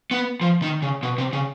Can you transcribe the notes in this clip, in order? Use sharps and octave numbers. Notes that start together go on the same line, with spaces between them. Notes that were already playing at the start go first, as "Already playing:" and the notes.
B3
F3
D#3
C#3
B2
C3
C#3